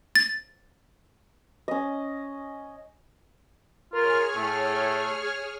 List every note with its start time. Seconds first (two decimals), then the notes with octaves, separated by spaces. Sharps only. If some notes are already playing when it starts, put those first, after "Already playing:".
0.16 A6
1.68 C#4 D#5
3.94 F4 G#4 A#4 C#5 F6
4.36 A2 A3